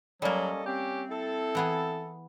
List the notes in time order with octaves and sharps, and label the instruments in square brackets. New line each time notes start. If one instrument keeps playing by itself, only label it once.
[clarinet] F#3 [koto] G3 A#3 [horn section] C#4 A4 D#5
[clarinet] C4 [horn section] C#4 G4
[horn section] E4 A4
[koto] E3 B3 G#4